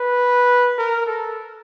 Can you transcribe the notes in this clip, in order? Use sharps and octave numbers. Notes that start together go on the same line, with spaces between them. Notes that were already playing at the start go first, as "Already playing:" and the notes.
Already playing: B4
A#4
A4